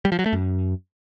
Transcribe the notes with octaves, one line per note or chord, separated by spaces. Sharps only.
G3
F3
F#3
A3
F#2